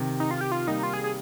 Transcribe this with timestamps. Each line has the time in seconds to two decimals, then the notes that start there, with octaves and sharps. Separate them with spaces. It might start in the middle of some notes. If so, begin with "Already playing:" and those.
Already playing: C3 D#3
0.20 D#4
0.31 F4
0.41 G4
0.52 F4
0.67 G3 A#3 D#4
0.83 F4
0.93 G#4
1.04 G#4